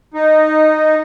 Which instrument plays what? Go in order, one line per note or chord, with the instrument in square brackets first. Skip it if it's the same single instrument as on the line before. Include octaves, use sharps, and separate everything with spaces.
[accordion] D#4